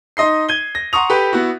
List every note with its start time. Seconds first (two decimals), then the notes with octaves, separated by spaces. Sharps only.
0.17 D#4 D#5 C6 C7
0.49 G#6 D#7 G7
0.75 A#6
0.93 F#5 A#5 C6 C#6 D#6 F7
1.10 G4 A4 B4 G5
1.33 B3 E4 F#4